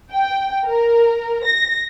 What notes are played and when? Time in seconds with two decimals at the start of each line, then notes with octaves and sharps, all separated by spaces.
0.11 G5
0.66 A#4
1.45 A#6